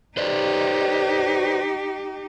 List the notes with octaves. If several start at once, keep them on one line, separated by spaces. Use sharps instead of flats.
D#4 G4 B4 C5 D5